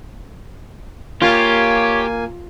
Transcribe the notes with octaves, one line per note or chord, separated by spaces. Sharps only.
A#3 F4 G4 C#5 G#5